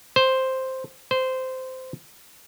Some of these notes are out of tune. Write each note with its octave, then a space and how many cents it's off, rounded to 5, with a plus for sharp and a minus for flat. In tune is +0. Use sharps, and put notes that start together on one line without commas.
C5 +0
C5 -15